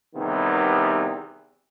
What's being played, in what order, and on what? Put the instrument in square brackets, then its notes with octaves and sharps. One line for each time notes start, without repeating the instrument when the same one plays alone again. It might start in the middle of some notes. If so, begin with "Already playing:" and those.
[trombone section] E2 C3 D#3 E3 G3 B3